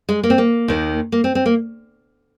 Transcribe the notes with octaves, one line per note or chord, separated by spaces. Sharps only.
G#3
A#3
C4
A#3
D#2 D#3
A#3
C4
C4
A#3